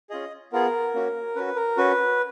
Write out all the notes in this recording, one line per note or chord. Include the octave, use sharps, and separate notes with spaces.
C#4 F4 G#4 D#5
B3 F4 G#4 A#4
A#3 C#4 F#4
C#4 F#4 B4
A#4
C#4 F#4 B4